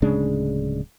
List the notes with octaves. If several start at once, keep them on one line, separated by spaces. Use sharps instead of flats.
D1 C#3 G#3 D4